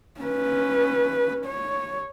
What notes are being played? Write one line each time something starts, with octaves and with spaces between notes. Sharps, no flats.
C#4 B4
C#5